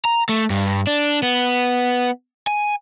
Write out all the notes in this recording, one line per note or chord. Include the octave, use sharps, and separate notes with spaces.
A#5
A3
G2
D4
B3
G#5